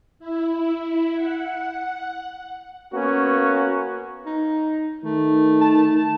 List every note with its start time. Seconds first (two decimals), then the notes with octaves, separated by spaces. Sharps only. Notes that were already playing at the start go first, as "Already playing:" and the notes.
0.19 E4
1.16 F#5
2.93 A#3 B3 C#4 F#4
4.26 D#4
5.04 D#3 A3
5.61 A5